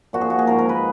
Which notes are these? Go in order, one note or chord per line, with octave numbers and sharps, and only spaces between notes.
A#2 F3 F#4
G#4
F#4
G#4
G#2 F3 A#4
A#4
B4